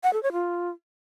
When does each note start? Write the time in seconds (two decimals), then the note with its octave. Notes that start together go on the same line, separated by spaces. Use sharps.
0.04 F#5
0.13 A4
0.23 C#5
0.33 F4